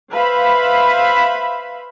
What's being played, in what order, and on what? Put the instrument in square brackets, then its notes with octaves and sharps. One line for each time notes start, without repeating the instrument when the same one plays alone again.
[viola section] B4 C5 E5 F5 B5